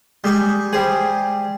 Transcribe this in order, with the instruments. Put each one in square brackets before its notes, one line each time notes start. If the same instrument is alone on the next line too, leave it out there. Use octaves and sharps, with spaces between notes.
[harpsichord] G3 G#4 C#6 [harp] G#3 G6
[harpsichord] G3 C5 [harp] G#4